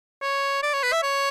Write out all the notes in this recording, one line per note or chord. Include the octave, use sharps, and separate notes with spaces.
C#5
D5
C#5
B4
E5
C#5